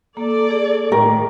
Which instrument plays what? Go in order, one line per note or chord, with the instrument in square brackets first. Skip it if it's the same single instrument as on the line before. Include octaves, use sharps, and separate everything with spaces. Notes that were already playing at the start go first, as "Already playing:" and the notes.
[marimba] A#3 [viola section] A4 D5
[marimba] G#4
[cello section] A2 D#3 [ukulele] A#4 [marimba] G5 C#6